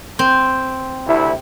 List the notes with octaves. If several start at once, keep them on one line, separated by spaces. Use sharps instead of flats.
C4
D2 C3 E4